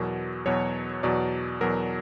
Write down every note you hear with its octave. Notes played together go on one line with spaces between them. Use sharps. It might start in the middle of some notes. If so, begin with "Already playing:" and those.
Already playing: E2 B2 F#3 A#4
E2 B2 F#3 C#5
E2 B2 F#3 D5
E2 B2 F#3 A#4